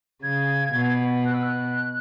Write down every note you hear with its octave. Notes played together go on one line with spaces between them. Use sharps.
C#3 G#6
B2
F#6
E6
F#6